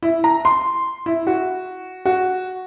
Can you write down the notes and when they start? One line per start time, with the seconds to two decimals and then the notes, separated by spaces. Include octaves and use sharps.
0.03 E4
0.24 A#5
0.45 C6
1.06 E4
1.27 F#4
2.05 F#4